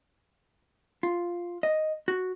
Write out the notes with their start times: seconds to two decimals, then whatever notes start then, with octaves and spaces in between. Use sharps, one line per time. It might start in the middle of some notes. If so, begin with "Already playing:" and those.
1.03 F4
1.63 D#5
2.08 F#4